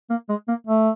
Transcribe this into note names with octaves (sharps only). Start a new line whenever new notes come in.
A#3
G#3
A#3
A3